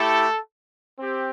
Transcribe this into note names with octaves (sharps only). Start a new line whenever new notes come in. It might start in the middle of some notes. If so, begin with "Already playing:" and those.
Already playing: A3 E4 G4 A4
C4 G4